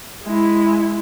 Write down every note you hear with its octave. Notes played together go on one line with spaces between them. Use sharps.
G#3 E4